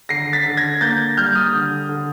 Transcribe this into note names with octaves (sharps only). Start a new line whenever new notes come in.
D3 A#6 C7
A6 B6
D3
G#6 A#6
A#3 G6 A6
G3 F6 G6
D#6 F6
D3
D3